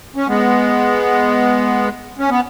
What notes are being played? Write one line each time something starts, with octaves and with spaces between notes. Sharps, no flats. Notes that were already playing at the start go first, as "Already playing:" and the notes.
C#4
G#3 B3
C#4
B3